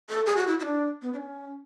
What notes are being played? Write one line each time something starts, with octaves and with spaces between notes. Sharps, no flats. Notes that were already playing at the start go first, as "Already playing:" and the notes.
A4
G#4
F#4
E4
E4
D4
B3
D4
C#4